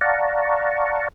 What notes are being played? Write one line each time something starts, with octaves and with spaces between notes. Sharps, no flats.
D5 F5 F#5 A5 A#5 C#6